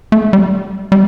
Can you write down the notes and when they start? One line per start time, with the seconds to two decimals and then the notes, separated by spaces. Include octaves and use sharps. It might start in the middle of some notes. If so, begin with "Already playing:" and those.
0.12 A3
0.33 G3
0.92 G3